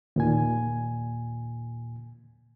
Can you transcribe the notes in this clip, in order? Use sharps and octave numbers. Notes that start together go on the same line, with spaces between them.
D#2 A#2 G#5